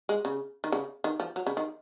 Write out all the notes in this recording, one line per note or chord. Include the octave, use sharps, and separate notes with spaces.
G#3
C#3
D#3
C#3
D#3
F3
F#3
C#3
D#3